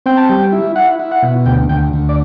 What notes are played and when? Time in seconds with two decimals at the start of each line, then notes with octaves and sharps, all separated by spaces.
0.06 C4 G5
0.17 A5
0.29 G3 G5
0.52 E4
0.76 E4 F#5
1.00 E4
1.11 F#5
1.22 B2
1.46 D2 G5
1.69 D2 G5
1.93 D2
2.09 D5